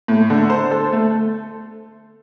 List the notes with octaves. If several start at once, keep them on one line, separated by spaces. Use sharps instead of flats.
A2
D3
C5
A4
A3